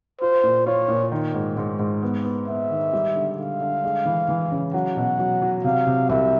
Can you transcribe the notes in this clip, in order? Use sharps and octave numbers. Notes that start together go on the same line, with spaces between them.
F4 C5
A#2
F4 C#5
A#2
D#3
G#2
G#2
G#2
B3
B3
B3 E5
D#3
G3
D3
D3 F5
D3
G#3
E3
E3
C#3
F#3 F#5
B2
F#3
F#3
C3 F5
C3
C2 E5